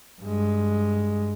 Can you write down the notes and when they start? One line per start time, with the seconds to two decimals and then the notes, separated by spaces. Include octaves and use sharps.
0.22 G2 G#3